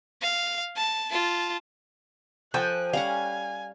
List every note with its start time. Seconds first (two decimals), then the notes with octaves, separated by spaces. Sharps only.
0.22 F5
0.76 A5
1.11 F4 A5
2.54 F3 A4 G5 G#5 F#6
2.93 G3 C#4 F5 F#5 G#5